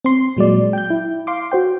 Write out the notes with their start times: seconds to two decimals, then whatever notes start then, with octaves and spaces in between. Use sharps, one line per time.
0.05 C4 C6
0.37 A#2 F#3 G#3 D5
0.73 G5 G6
0.90 E4
1.27 F5 C6 D6
1.52 F#4 C5 G5